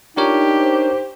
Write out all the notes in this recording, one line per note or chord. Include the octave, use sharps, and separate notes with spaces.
D4 D#4 F4 G4 A#4 C#5
C5